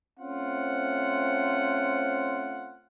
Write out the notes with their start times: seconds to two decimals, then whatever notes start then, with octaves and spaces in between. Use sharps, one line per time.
0.20 A3 C4 C#4 F4 C5 F#5